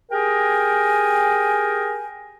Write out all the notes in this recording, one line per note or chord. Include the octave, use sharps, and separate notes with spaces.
G4 G#4 A#4 G5 G#5